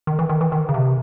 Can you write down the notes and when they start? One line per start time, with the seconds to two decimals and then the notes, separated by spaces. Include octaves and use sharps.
0.07 D#3
0.19 E3
0.29 D#3
0.41 E3
0.52 D#3
0.69 C#3
0.74 C3